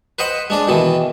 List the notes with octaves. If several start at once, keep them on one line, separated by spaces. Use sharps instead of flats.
B4 C5 D#5 F#5 B5
G#3 D4 D5
B2 D#3 E3